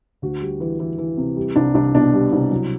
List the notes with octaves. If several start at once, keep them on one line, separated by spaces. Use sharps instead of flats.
D2 F#4
G3
E3
E3
E3
C3
G3
C2 D4
C2 D4
B2 D4
G3
C2
F#3